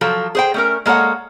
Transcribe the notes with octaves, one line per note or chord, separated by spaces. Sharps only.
F3 F#3 A4
G#4 C5 G5
A3 C#4 A#4
G#3 A#3 A4 C#5 F#5